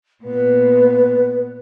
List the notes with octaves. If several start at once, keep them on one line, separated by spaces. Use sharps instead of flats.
A#2 B3 B4